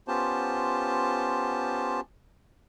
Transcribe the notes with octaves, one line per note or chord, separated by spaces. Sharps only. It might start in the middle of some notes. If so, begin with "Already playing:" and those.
B3 C#4 F4 G4 C5 A5